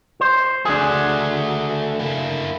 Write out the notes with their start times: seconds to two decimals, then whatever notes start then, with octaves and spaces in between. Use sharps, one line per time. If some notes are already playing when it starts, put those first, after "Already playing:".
0.21 C5
0.65 A3 D4 F#4 G#4
2.00 A#3 E4